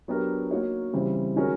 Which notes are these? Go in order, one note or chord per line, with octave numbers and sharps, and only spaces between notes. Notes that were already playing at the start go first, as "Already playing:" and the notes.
F#3 B3 D4 G4 A#4
A#3 D#4 F#4 A#4 C#5
C#3 E3 G3 C4
D#3 G#3 C#4 F#4 A#4